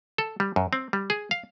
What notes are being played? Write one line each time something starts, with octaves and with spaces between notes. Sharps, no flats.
A4
G3
F#2
C4
G3
G#4
F5